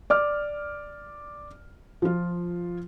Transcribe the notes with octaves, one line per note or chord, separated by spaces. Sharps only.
D5 D6 F6
F3 F4